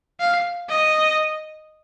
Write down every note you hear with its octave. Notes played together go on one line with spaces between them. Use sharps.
F5
D#5